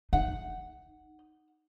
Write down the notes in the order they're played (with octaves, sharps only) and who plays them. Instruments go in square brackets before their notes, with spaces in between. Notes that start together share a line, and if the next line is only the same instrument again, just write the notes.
[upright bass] D#4 [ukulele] F#5